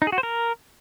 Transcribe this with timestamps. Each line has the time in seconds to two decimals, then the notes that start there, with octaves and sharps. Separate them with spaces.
0.02 D#4
0.07 G#4
0.12 F#4
0.18 C5
0.23 A#4